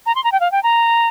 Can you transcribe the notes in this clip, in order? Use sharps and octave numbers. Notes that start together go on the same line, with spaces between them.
A#5
C6
A#5
G5
F5
G5
A#5